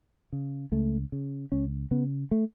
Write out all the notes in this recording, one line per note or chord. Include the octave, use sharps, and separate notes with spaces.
C#3
C#2 A3
C#3
C#2 C#4
C#3 B3
A3